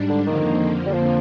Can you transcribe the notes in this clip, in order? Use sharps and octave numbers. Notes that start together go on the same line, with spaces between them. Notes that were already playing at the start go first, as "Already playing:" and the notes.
Already playing: G#2 G3 D4
D3
F2 D3 D#3 F3 A#3
G3
F3